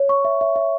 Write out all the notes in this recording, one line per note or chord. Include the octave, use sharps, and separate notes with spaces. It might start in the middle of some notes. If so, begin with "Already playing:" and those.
Already playing: C#5
C#6
E5
E5
E5